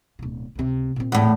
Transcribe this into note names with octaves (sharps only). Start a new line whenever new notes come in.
D1 B2
C#2 C3
A#2 C4
E2 A2